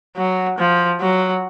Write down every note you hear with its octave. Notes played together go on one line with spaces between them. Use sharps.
F#3
F3
F#3